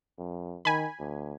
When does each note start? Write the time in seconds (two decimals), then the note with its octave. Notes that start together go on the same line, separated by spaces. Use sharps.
0.19 F2
0.65 D#3 G#5 B5
0.99 D2